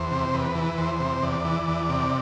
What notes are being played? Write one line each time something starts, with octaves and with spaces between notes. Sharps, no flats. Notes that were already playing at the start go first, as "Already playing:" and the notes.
Already playing: E2 C5
C3
E2 B4
E3
E2 C5
C3
E2 D5
E3
E2
C3